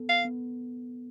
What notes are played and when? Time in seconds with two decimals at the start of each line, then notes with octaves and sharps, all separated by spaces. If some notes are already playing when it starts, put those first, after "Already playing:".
Already playing: B3 A4
0.09 F5
0.25 B3